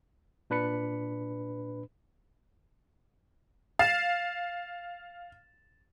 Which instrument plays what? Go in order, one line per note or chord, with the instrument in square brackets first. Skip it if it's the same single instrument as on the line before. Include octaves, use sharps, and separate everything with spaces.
[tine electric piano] A#2 D4 B4 B5 C#7
[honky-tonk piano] F5 [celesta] A6 E7